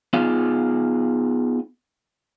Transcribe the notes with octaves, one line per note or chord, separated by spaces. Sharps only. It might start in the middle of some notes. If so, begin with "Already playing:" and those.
B3 D#4 F4 G#4 F5